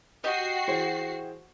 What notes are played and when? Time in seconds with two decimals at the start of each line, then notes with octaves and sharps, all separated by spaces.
0.24 F#4 G4 D#5 C7
0.67 E3 G#4 C5